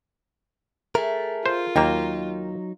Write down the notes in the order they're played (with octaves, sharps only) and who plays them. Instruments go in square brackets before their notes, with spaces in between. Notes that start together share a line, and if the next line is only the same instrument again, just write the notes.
[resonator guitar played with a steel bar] A3 [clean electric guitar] G#4 A#4
[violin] F4 [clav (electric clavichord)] C5
[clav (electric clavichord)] D#2 A#3 [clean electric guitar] F#3 D#4 [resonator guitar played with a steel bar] A#4 G5